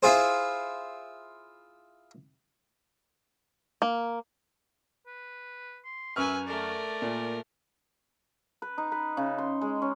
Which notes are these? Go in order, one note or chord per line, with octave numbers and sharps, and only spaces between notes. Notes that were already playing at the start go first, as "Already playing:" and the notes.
E4 F4 G#4 C5
A#3
B4
C6
F#2 B4 E5 G#5 C#6 F6
A3 A#4 D5
A#2
B4
D#4
B4
C#3
C6
G#3
C#4